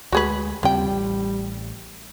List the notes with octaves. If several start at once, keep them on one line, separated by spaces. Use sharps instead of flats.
D2 G#3 F#4 G#4 B4
D#2 C#3 F3 G3 C4 G5
A1